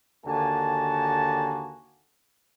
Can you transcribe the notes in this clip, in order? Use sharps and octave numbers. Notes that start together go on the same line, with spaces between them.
D#2 D3 A#3 F#4 G#5 A5